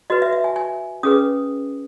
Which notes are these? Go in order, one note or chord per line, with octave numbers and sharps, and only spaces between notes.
F#4 B4 D#5
E5
E5
G#5
G#5
C#4 G#4 B4 D#6